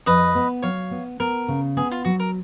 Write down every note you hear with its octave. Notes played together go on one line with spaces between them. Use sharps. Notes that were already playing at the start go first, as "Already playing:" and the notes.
F2 B4 D#5
B3
F#3 C#5 F5
B3
B3 A#4
C#3
B3 G#4
F4
F#3 F#4
A#4